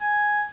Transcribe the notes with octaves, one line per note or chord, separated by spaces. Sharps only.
G#5